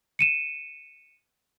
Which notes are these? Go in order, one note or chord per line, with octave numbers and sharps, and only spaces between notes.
C#7 D#7 E7